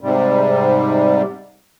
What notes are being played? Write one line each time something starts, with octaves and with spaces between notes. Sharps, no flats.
G#2 C3 G3